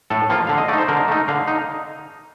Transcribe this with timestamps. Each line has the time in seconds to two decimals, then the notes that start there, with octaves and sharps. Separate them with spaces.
0.10 A2 A4
0.30 F3 A#3 F4
0.47 D3 F5
0.58 D#5
0.68 A3 D#4 D5
0.78 C5
0.88 D3 A#4
1.08 A3 D#4
1.28 D3 F5
1.47 D#4